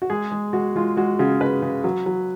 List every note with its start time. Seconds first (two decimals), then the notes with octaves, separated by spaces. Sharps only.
0.02 F#4
0.10 G#3 G#4
0.32 G#3
0.53 G#3 F#4
0.75 G#3 F4
0.97 G#3 F#4
1.19 C#3 F#4
1.41 C#3 B4
1.62 C#3
1.84 F#3
2.06 F#3